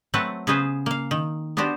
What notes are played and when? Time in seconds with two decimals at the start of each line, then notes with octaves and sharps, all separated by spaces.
0.14 F#3 A3 C4 B4 F#5 A5
0.47 C#3 B3 C#4 G#4 B4 C5
0.86 A#3 F5
1.11 D#3
1.57 B3 D4 F#4 G4 C5 D5